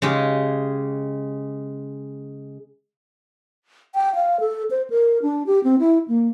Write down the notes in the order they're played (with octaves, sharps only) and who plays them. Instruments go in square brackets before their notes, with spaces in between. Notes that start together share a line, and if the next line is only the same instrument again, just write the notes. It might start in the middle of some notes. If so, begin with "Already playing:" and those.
[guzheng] C#3 G#3 G4 G#4
[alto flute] G5
F5
A4
C5
A#4
D4
G4
C4
E4
A#3